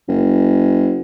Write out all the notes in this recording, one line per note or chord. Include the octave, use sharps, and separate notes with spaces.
F#1